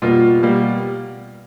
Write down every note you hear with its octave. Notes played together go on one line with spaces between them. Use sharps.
B2 G3 A#3 F4
B2 G3 A#3